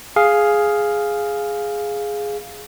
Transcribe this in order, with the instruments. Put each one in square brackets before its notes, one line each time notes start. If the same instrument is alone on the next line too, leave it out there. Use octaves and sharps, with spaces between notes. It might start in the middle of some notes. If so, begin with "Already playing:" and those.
[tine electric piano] G#4 F5